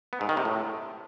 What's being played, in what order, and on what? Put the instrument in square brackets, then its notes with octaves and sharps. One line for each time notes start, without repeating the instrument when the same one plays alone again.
[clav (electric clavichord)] B3
G#2
D#3
C3
A2